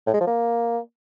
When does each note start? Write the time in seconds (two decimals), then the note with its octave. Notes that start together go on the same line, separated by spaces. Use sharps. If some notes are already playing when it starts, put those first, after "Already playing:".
0.07 A2
0.13 G#3
0.20 F3
0.27 A#3